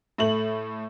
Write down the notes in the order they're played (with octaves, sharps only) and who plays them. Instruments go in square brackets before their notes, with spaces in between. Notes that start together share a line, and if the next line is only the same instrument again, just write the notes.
[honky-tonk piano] A2 A3 F#7